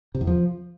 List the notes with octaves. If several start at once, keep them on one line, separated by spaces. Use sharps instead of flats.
C3
E2
F3